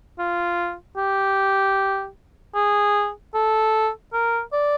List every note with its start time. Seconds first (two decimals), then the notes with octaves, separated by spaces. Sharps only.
0.19 F4
0.97 G4
2.55 G#4
3.34 A4
4.13 A#4
4.53 D5